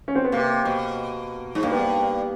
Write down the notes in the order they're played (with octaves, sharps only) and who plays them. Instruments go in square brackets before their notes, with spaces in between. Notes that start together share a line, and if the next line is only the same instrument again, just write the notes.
[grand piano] C#4
C4
B3
[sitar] C3 [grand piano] A#3
[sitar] B2
G#2
[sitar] G2 [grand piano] A#3
[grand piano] B3
A#3